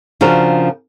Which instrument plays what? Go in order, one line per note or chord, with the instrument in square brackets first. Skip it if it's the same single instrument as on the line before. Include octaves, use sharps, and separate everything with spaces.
[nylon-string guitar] C#3 F3 D4 F#4 A#4